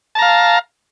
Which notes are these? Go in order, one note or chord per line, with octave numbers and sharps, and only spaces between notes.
F5 A5 A#5